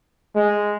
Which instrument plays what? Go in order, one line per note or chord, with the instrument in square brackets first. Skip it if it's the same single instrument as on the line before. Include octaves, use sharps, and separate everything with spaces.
[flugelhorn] G#3